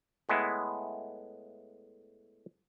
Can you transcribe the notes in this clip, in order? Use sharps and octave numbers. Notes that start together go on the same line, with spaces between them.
A2 G#3 B3 E4